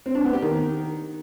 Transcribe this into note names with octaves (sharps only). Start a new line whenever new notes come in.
C4
D4
B3
G4
D#3